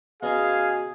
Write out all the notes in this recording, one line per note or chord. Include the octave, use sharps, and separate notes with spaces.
B2 C#4 G#4 F5